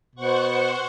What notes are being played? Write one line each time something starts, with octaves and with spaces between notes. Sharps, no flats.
B2 C5 F#5 C#6